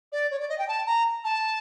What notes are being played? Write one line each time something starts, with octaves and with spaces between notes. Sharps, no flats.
D5
C#5
D5
D#5
G5
A5
A#5
A5